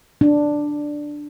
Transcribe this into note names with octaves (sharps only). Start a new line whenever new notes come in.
D4